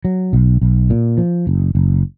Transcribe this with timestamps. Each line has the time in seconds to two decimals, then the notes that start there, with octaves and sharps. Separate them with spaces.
0.05 F#3
0.33 B1
0.62 B1
0.90 A#2
1.18 F3
1.47 F#1
1.75 F#1